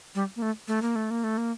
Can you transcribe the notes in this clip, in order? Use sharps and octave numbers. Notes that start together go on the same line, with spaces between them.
G3
A#3
A3
A3
A#3
A3
A#3
A3
A#3